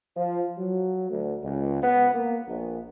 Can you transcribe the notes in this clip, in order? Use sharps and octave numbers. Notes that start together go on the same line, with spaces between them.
F3
F#3
D2
C#2
B3
A#3
A#1